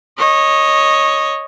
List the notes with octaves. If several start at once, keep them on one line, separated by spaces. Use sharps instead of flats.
C#5 D#5